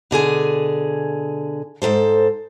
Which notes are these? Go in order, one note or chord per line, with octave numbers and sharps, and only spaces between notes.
B2 D3 G#4 G#5
G#2 C#3 A4 C5